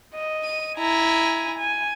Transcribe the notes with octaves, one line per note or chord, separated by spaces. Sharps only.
D#5
D#7
E4 G#5 A#5
G#5